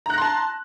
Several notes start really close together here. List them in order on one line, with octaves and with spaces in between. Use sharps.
A#5 F#6 A#6 C6 A5